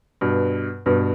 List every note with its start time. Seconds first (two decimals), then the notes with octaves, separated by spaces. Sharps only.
0.21 G2 B2
0.86 G2 B2